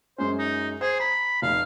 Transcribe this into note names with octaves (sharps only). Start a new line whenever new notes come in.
F#2 G#3 C#4 C5
D#4
G#4 C5
A#5 B5
F1 F5